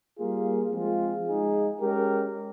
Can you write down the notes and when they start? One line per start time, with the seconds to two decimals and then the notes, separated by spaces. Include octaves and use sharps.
0.17 G3 A#3 F4 G#4
0.72 F3 G#3 C4 F4 G#4
1.26 G#3 D#4 G#4
1.81 G#3 C#4 G4 A#4